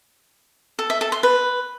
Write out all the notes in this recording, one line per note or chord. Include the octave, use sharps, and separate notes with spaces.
A4
E5
A4
C6
B4